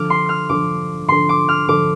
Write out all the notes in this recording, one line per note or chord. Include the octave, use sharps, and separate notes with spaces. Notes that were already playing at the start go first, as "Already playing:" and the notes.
Already playing: D3 F3 D4 A4 D6 F6
C6
F6
D3 F3 D4 A4 D6
D3 F3 D4 A4 C6
D6
F6
D3 F3 D4 A4 D6